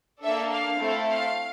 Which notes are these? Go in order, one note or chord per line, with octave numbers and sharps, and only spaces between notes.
A#3 D4 A4 E5
F5
A3 C4 E4 A4
F5